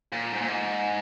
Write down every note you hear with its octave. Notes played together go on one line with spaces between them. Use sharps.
A#2
G#2
A#2
G#2